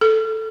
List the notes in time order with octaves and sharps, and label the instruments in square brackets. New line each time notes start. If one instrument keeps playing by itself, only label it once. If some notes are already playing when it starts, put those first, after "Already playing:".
[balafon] A4